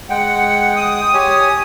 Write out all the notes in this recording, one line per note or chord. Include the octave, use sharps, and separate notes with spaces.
G#3 F#5 G5
D#6
G4 C#5 G#5